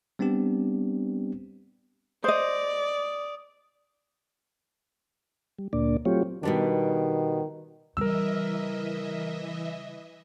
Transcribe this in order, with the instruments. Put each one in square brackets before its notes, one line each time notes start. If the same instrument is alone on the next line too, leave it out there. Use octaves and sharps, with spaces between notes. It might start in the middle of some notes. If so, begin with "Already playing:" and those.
[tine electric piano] G3 B3 C4 D4 G4
[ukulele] C5 D#5 [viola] D5 [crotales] D#6
[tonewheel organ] G3
D2 A#2 A#3 D4 D5
F#3 A3 C4 F4 G4 C#5
[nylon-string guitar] B2 G3 D4 [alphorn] D#3
[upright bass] C#3 G3 [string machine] E3 D#5 E5 [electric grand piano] A#4 E6